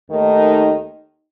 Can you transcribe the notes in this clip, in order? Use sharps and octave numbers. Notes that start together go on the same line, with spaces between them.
D#2 D#3 A3 D#4